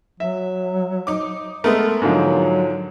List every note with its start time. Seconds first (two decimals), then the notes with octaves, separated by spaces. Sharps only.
0.20 F#3 E5
1.07 D#4 D6
1.64 G#3 A3 B3 A#4
2.02 G#2 D3 F3 F#3